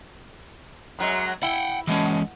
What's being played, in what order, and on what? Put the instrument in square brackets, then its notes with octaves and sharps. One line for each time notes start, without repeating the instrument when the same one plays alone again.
[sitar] F#2 F#3 G#3
[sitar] E4 [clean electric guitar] F#5 G5
[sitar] B2 [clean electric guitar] E3 G#3 C#4